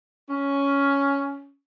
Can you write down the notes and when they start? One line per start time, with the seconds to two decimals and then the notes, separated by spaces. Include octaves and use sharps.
0.29 C#4